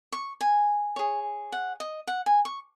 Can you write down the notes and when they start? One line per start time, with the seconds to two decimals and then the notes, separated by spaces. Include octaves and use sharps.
0.12 C#6
0.41 G#5
0.96 G#4 C#5
1.52 F#5
1.80 D#5
2.07 F#5
2.26 G#5
2.45 C#6